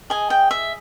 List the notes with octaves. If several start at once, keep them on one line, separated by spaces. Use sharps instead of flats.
G#4 D#5 G#5
G5
E5